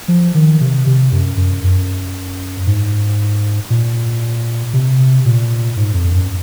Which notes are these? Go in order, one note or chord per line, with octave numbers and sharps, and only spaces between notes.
F3
D#3
C3
C3
F#2
F#2
F#2
G#2
A#2
C3
A#2
G#2
F2
F#2